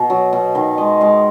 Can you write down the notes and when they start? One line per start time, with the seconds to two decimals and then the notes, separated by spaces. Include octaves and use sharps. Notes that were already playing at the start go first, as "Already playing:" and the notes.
Already playing: B2
0.10 F#3
0.33 B2
0.55 D#3 F5
0.78 G#3 D#5
1.01 G#3 F5